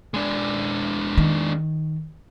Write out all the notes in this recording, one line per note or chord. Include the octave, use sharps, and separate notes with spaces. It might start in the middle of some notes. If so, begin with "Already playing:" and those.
G#3 D4
D#3